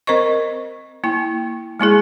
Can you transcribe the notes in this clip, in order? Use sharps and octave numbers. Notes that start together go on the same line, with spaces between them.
C4 A#4 C5 D#5 C#6
A#3 E4 G5
G#3 A#3 E4 G#4